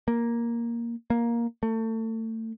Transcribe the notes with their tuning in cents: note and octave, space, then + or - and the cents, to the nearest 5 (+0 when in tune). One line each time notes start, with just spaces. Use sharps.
A#3 +5
A#3 +10
A3 +30